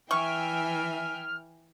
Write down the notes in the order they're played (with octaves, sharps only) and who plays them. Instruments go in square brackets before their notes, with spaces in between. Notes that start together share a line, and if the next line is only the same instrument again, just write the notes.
[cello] E3 [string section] E5 G5 G#5 [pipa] C#6 [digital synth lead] F6